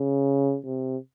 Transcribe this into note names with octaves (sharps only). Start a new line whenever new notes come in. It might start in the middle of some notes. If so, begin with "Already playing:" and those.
Already playing: C#3
C3